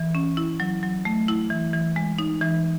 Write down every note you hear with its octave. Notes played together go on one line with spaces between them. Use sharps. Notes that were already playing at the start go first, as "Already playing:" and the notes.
Already playing: E3
C#4
E4
F#3
F#3
A3
E4
E3
E3
G#3
D#4
E3